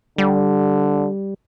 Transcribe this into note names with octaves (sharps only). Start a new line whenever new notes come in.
D3 G3